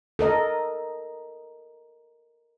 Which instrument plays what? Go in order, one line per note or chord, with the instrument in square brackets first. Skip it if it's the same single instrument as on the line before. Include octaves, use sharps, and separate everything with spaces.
[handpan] A4 A#4 D#5